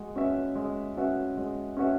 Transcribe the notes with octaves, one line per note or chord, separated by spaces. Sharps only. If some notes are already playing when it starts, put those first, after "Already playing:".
Already playing: G#3 F#4
C#4 F#4 B4 E5
G#3
C#4 F#4 B4 E5
G#3
C#4 F#4 B4 E5